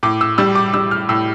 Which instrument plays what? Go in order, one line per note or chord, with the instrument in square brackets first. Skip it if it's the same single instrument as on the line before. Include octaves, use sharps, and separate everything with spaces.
[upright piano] A2 D6
E6
G3 E6
D6
G3 E6
F6
A2 E6